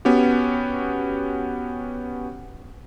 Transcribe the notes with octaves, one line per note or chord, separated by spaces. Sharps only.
B3 C#4 F#4 G4